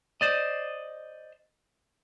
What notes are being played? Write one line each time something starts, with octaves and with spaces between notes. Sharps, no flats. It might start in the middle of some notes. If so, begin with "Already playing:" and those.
C5 D5 D#5